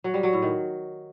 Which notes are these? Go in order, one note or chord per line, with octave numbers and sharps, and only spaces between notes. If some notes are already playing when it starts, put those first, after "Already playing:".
F#3
G3
F#3
A2
D#3